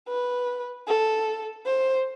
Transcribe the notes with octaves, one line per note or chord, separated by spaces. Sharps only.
B4
A4
C5